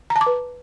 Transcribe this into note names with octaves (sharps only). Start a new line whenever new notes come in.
A#5
A5
D6
B4